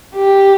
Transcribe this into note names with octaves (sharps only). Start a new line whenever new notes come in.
G4